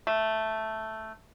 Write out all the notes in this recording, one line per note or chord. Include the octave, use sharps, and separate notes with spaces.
A3